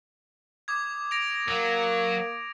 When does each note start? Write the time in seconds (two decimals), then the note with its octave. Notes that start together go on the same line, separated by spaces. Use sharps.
0.68 D6 D#6 G#6
1.11 A#6 D7 F7
1.48 F#3 A#3